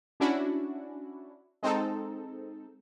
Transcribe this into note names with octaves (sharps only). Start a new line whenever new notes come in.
C#4 D4 E4 F#4
G#3 C4 D#4 A4